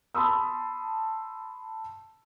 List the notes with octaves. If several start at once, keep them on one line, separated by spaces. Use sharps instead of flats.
A5 B5 C6 D#6 E6